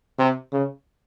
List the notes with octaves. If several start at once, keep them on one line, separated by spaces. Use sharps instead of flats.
C3
C#3